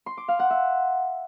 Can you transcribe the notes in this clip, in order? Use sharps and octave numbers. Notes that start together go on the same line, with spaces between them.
C6
D6
F5
F#5
E5